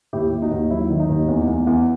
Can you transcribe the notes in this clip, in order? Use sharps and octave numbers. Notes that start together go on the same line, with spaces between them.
D#2 E4 G4
D#2
D#4 F#4
D#2
F#3 E4
D#3
D#4
D#2
E2
E2
E2